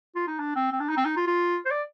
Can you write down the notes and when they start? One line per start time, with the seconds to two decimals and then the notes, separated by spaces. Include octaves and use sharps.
0.16 F4
0.28 D#4
0.39 D4
0.56 C4
0.72 C4
0.80 D4
0.89 D#4
0.97 C4
1.05 D#4
1.17 F4
1.27 F4
1.65 C5
1.71 D5